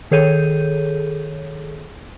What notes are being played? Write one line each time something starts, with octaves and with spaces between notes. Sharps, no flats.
D#3 G#4 A4 C#5 G6 D#7